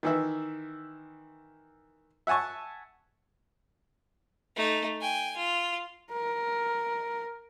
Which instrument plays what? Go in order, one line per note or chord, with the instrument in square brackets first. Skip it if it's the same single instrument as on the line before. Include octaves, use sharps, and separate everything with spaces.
[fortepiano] D#3 E3 E5
E5 F#5 G#5 A5 C#6
[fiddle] A3 D#4
G5 G#5
F4
[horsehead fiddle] A#4